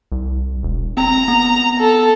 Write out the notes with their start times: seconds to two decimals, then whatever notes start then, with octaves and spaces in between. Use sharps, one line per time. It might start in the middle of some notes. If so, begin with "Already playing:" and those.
0.12 C2
0.63 E1
0.97 C4 A#5
1.28 B3
1.80 A4